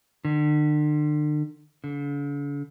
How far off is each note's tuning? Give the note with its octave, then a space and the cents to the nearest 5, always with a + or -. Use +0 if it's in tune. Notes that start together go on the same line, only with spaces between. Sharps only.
D3 +40
D3 -45